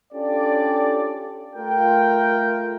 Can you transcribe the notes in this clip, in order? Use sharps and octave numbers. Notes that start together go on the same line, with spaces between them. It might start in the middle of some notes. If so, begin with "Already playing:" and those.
C#4 D4 F4 G4 A4 D5
A3 F4 A#4 G5